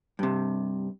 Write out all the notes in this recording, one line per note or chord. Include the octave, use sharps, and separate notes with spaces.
G2 C3